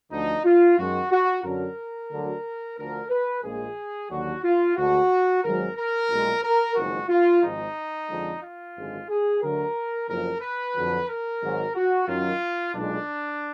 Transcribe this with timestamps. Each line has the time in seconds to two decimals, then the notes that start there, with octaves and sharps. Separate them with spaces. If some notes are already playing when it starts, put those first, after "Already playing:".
0.11 D2 D3 F3 D#4
0.45 F4
0.77 F#2 D#3 G#3 F#4
1.10 F#4
1.44 F#2 D3 F#3 A#4
2.10 D2 D3 F#3
2.77 D2 D3 F3 A#4
3.10 B4
3.43 A#1 A#2 G#3 G#4
4.09 D#2 D3 F#3 F#4
4.43 F4
4.76 D2 D3 G#3 F#4
5.43 G#1 G#2 F#3 A#4
5.77 A#4
6.09 B1 A#2 G#3
6.42 A#4
6.75 F#1 F2 D#3 G#3 F#4
7.09 F4
7.42 G#1 G#2 F3 G#3 D#4
8.09 F2 D3 F3 G#3
8.42 F4
8.76 G#1 F#2 D3 G#3
9.08 G#4
9.41 D2 D3 F#3 A#4
10.09 F#1 F2 F3 A#4
10.41 B4
10.75 F2 D3 F#3
11.08 A#4
11.41 G#1 G#2 F#3
11.75 F#4
12.08 F#2 D#3 F#3 F4
12.74 B1 A#2 G#3 D4